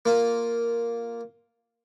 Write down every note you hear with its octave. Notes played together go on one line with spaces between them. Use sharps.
A#3 F4